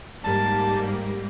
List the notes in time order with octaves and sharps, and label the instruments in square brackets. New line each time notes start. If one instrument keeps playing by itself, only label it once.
[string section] G#2 G3 A#3 [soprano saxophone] A5